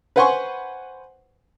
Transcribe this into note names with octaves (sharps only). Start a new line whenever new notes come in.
B4 C5 F#5 G#5 C6 C#6